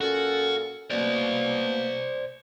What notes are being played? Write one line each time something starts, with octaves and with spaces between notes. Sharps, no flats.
A#2 C#4 F#4 A4
B2 A3 A#3 C5 D5